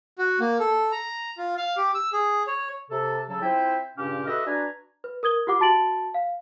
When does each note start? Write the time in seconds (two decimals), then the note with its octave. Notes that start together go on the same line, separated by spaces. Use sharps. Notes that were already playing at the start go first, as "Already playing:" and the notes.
0.18 F#4
0.40 A#3
0.60 A4
0.92 A#5
1.38 F4
1.57 F5
1.77 G4
1.95 E6
2.13 G#4
2.47 C#5
2.90 C3 A4
3.28 C#3 F#3 A4
3.41 C4 E4 F4 E5 G5
3.97 G2 A#2 C#3 C#4 G4 F5
4.27 F#4 A4 B4 D#5 E5
4.45 D4 F#4 B4 G#5 A#5
5.04 B4
5.23 A#4 D#6 G#6 G7
5.47 F4 G4 F#5 D6
5.60 F#4 A5 A6 D7 F#7
6.14 F5